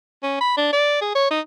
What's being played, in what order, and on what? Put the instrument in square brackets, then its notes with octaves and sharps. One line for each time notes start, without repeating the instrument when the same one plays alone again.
[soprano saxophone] C#4
B5
D4
D5
G#4
C#5
D#4